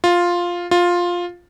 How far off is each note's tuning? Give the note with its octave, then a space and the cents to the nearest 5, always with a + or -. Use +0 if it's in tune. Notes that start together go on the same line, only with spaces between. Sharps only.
F4 +5
F4 +10